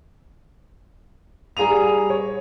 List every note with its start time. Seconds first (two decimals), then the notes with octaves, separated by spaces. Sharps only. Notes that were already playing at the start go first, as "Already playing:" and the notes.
1.57 G3 G#4 A#5 D#7 F7
2.10 C#5